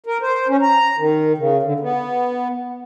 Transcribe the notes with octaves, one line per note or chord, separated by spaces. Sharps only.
A#4
C5
C#4
A#5
D#3
C#3
D3
B3